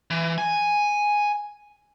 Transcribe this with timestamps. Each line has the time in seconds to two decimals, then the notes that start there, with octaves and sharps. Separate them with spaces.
0.10 E3
0.38 G#5